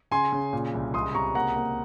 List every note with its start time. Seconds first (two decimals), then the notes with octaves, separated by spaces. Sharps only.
0.11 C#3 G#5 C6
0.32 C#3
0.53 A#2
0.74 C2
0.94 C#2 C6 D#6
1.15 C3 A#5 C#6
1.35 A#3 F#5 A#5
1.56 A#3